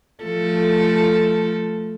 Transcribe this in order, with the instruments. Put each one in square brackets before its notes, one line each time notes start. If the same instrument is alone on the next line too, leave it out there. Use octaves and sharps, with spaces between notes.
[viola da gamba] F3 A3 A4